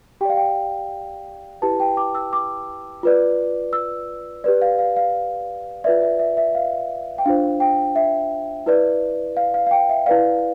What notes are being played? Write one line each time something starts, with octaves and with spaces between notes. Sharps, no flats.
G4 D5 F5 G5
G5
E4 G4 B4 A5
G5
D6
E6
D6
F4 B4 D5
E6
G4 B4 D5
F5
F5
F5
F4 B4 D5 E5
E5
E5
E5
F5
G5
D4 F4 C5 F5
G5
E5
E4 B4 D5
F5
F5
F5
G5
E5
E4 B4 D5 F5